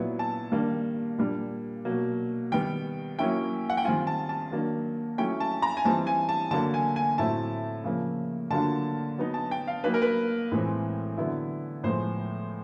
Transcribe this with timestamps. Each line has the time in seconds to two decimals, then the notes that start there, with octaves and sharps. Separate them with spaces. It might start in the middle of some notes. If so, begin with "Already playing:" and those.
Already playing: A#2 F#3 B3 E4
0.19 A5
0.52 D#3 G3 A#3 D4
1.18 A#2 G3 A#3 D4
1.85 B2 F#3 A#3
2.52 D#3 G3 B3 G5
3.19 F#3 A#3 C#4 E4 G5
3.70 F#5
3.77 G5
3.85 D#3 G3 C4 F4 G#5
4.07 A5
4.29 A5
4.52 D#3 F#3 A#3 D4
5.18 F#3 A3 C#4 E4 G5
5.40 A5
5.62 A#5
5.77 G#5
5.85 E3 G3 C4 D#4 A5
6.07 G#5
6.29 A5
6.51 D3 F#3 A#3 A5
6.74 G#5
6.96 G#5
7.18 A2 F#3 A3 C4 E4 A5
7.84 C#3 F3 A#3
8.51 D3 F#3 A#3 D4 F4 A5
9.18 F#3 B3 D#4
9.34 A5
9.51 G5
9.68 F5
9.84 F#3 A#3 D#4 B4
9.94 A#4
10.02 B4
10.51 A2 E3 G#3 C4
11.17 D3 F#3 B3 E4
11.83 A2 F3 G#3 B3 C5